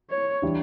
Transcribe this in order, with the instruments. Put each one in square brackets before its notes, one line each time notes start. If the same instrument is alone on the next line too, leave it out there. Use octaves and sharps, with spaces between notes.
[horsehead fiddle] C#5
[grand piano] E3 G3 D4